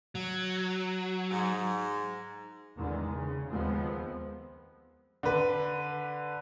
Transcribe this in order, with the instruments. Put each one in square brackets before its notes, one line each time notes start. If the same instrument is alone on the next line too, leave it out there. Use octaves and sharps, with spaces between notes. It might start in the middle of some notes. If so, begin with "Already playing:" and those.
[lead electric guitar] F#3
[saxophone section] G#2
[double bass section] E2 D3 D#3 G#3
C#3
D#2 F3 G#3 B3 C4
[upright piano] D3 B4